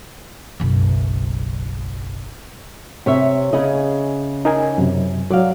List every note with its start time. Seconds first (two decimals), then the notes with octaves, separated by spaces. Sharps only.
0.60 F#1 B1
3.06 C3 C#5 E5
3.53 C#3 G#4 D#5
4.45 D#4 A#4 G#5
4.78 F#2 C3
5.30 F#3 D5 F5